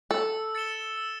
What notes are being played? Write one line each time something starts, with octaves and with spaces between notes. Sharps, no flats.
A4 E6
A6 C#7 E7 G7
E6